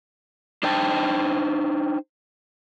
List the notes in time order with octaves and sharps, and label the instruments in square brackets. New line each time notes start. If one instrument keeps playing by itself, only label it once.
[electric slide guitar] D4 D#4 C5 G5 A5